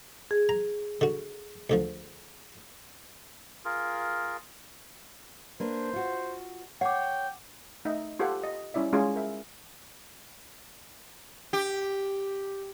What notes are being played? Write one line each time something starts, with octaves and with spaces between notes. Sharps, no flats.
G#4
A#5
D3 F#4
D2 D3 F3
F4 G#4 A#4
A#3 D4 B4 C5
F4 F#4
C#5 F#5 G5 D6
A3 D#4 D#5 E5
F4 G4 A4 C5 F5 F#5
D#5
G3 C#4 E4 D5 E5
G#3 C#4 F4 G#4
A#4 E5
G4